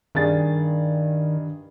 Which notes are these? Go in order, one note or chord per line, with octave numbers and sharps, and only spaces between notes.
G2 D#3 G#4 A6